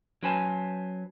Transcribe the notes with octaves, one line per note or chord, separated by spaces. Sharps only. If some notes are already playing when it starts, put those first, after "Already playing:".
F#3 C#4 B4 C5 G#5 A5